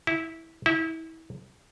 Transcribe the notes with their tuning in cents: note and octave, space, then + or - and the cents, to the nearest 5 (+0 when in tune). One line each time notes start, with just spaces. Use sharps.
E4 -15
E4 -30